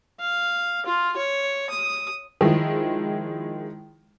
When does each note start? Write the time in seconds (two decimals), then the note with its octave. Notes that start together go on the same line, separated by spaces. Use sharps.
0.20 F5
0.86 F4
1.16 C#5
1.70 D#6
2.41 D#3 F3 G#3 E4